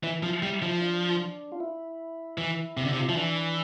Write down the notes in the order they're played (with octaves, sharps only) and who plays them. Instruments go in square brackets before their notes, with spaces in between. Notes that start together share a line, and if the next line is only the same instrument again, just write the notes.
[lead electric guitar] E3 [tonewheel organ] E4
[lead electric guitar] F3
G3
F3
[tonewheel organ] D4
F4
E4
[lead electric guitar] E3
C3
D3
C3
[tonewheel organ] F4
[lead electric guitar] F3 [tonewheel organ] E4
[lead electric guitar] E3 [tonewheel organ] D4